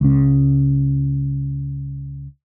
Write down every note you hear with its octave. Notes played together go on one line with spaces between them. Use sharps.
C#2 C#3